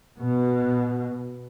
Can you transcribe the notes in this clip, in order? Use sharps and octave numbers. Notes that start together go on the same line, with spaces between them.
B2